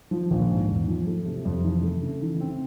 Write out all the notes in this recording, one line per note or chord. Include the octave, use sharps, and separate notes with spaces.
F3
A#1
G#2
E2
F3
A3
C3
F2
E3
A3
C#3
E3
C4